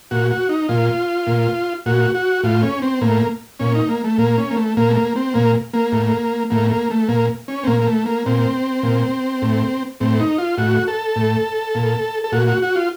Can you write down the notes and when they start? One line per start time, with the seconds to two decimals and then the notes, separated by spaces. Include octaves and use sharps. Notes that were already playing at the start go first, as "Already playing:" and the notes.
0.11 A#2 F#4
0.31 F#4
0.49 D#4
0.69 A#2 F4
1.27 A#2
1.86 A#2 F#4
2.15 F#4
2.44 A2 F4
2.63 C#4
2.82 C4
3.01 A2 A#3
3.60 A#2 C#4
3.75 D#4
3.89 A#3
4.04 A3
4.18 A#2 A#3
4.38 C#4
4.51 A#3
4.56 A3
4.77 A#2 A#3
4.90 A3
4.96 A#3
5.16 C4
5.34 A#2 A#3
5.73 A#3
5.92 A2
6.50 A2 A#3
6.71 A#3
6.90 A3
7.09 A#2 A#3
7.48 C#4
7.64 C4
7.67 A#2 A#3
7.82 A#3
7.87 A3
8.06 A#3
8.26 A#2 C4
8.83 A#2
9.42 A2
10.00 A2 C4
10.20 D#4
10.38 F4
10.58 A2 F#4
10.88 A4
11.16 A2
11.75 A#2
12.24 A4
12.32 A#2 F#4
12.47 F#4
12.62 F#4
12.76 F4